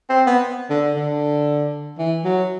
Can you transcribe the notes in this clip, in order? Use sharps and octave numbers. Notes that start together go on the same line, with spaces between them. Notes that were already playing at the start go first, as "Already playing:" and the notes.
C4
B3
D3
D3
E3
F#3